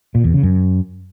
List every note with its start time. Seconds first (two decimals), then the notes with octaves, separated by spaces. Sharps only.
0.15 A#2
0.24 E2
0.34 C#3
0.43 F#2